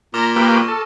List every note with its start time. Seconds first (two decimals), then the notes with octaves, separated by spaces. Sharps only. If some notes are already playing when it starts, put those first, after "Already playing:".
0.14 A#2 A#5 D6 F6 A#6
0.36 A#3 G4 B4 E6
0.52 C#6
0.68 A4